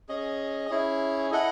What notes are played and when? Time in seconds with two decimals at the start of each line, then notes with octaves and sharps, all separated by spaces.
0.09 C#4 G#4 D#5
0.70 C#4 E4 G#4
1.31 E4 A4 D#5 F#5